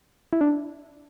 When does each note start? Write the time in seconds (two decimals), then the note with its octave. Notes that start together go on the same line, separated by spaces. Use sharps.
0.33 E4
0.41 D4